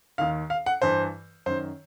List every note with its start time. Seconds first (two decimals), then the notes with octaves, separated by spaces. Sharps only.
0.18 D#2 D#3 F5
0.50 F5
0.66 F#5
0.82 G2 E3 C5
1.46 F#2 D#3 C5